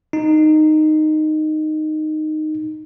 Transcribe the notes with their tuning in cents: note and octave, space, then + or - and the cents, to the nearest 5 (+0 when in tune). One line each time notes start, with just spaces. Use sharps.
D#4 -10